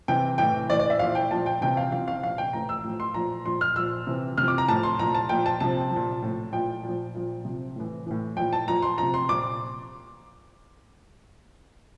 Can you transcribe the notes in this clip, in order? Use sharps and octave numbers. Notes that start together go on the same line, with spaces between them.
C3 E3 G5
A2 E3 G5
A2 E3 D5
D5
E5
A#2 F3 F5
G5
A#2 F3 A5
G5
C3 E3 G5
F5
C3 F3 F5
F5
A#2 F3 F5
G5
A2 E3 A#5
E6
A2 F3
C6
A#2 F3 A#5
A#2 F3 C6
F6
A#2 F3 E6
C3 E3
C3 F3 F6
D6
A#5
A2 F3 A5
C6
A#2 F3 A#5
A5
A#2 F3 G5
A5
C3 F3 A5
F3
A#2
A2 F3
A#2 F3 G5
A#2 F3
A#2 F3
C3 F3
A2 E3
A2 E3
A#2 F3 G5
A5
A#2 F3 A#5
C6
C3 F3 A#5
C6
A#2 F3 D6